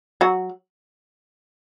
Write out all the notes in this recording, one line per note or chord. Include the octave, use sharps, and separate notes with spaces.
F#3 F#4